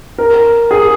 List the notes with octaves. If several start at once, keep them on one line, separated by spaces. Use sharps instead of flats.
A#4
G#4